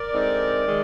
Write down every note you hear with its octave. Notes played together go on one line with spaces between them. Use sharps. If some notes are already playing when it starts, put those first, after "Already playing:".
Already playing: A#4 D5
D3 G#3 C4 D#4
D#3 G#3